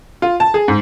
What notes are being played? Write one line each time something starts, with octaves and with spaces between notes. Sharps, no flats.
F4
A5
G#4
G#2